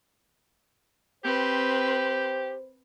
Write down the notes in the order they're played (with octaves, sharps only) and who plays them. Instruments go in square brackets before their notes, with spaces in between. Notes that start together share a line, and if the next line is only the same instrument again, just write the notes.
[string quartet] C4 B4 C6 [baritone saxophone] G4 [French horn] C5